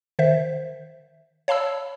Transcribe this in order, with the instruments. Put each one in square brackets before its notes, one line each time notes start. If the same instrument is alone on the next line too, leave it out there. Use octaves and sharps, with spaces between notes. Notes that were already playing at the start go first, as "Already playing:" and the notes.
[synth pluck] D#3 C5 E5
C#5 F5 A5 B5 E6